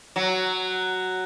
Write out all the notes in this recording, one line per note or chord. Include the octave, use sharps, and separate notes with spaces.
F#3